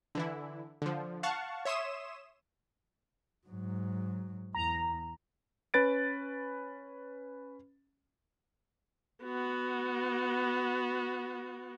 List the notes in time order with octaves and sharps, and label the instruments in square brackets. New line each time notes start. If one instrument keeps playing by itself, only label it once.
[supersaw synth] D3 E3 E4
D3 F3
F5 F#5 A5 C#6
C#5 E5 C6 D#6 E7
[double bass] G#2 F#3
[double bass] E2 [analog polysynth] A#5
[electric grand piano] C#4 B4 A6 D7
[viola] B3 F#4